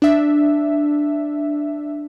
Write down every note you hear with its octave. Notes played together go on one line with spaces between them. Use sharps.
D4 E5